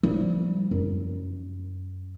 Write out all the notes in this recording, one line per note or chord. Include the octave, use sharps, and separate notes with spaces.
F3 G3
F#2